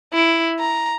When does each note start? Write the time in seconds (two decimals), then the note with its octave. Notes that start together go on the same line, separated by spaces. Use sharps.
0.14 E4
0.60 A#5